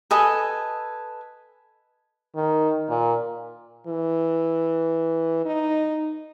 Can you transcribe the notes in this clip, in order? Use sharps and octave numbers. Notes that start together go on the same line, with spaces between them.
A4 B4 D#5 G#5
D#3
A#2
E3
D#4